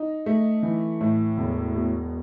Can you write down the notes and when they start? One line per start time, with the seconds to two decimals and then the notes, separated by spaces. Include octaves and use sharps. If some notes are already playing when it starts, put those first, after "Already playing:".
Already playing: D#4
0.26 A3
0.63 E3
1.01 A2
1.38 E1
1.75 B2